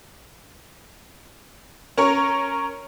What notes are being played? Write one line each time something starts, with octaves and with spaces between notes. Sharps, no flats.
C#4 A#4 C#5